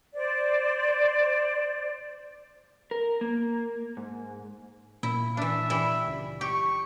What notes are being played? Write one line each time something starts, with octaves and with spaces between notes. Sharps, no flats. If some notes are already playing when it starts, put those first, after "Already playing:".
C5 D5
A#4
A#3
G#2
A#2 E4
E3 D4 E5
E3 G3 E4
C#2
G4 C#6